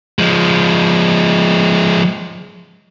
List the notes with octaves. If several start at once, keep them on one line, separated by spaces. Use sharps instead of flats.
F3 G#3